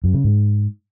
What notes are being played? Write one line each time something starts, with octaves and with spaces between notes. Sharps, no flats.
F#2
C#3
G#2